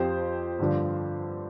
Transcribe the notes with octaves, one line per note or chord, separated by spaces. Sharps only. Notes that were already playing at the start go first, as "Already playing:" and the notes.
Already playing: F2 F3 G4 C5
G2 D3 F3